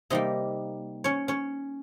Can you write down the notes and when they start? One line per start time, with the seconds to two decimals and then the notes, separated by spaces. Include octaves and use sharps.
0.10 C3 G3 A#3 D#4 D#5
1.04 C#4 C#5
1.28 C#4 C#5